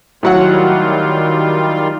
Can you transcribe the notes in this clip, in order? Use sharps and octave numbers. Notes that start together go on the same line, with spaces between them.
A2 D#3 F#3 G3 F4 F#5